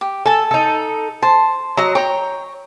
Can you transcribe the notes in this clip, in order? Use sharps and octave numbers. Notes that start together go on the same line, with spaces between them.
G4
A4 G#5 A5
D#4 A4
C5 A5
F#3 D#5 A#5
C#5 G5 A#5